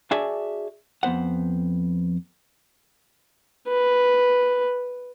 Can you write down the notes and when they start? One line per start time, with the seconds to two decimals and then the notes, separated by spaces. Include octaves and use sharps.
0.11 D4 F#4 G#4 D5 E5 G#5
1.03 F2 B3 C5 F#5
3.69 B4